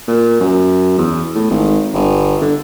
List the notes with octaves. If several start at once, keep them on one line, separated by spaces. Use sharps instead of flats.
A#2
F#2
E2
A2
G#1
G1
D3